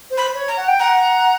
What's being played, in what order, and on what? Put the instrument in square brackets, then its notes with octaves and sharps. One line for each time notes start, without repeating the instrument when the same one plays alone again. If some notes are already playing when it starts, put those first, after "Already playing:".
[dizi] C5
[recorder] B5
[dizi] C#5
[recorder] A#5
[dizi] F#5
G5
[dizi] F#5 [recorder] A#5